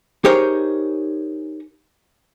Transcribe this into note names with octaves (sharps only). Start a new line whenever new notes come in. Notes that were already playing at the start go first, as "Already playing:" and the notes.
D#4 G4 G#4 A#4 C5 C#5